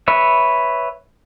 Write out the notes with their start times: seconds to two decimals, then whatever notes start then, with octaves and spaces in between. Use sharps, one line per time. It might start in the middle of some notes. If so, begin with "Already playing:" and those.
0.08 B4 C#5 E5